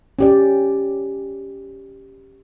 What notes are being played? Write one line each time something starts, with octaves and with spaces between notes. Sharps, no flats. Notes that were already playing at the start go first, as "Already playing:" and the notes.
C#4 G4 D5